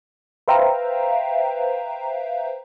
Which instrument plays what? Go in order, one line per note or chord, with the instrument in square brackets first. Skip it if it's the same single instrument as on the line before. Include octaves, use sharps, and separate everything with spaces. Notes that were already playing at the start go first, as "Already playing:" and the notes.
[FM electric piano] B4 C5 E5 F5 G5 A#5